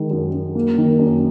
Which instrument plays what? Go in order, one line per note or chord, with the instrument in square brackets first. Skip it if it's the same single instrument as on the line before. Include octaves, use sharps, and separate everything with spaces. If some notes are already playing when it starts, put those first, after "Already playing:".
Already playing: [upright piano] D#3 G#3
F#2
F#2
A#3
D#3
F#2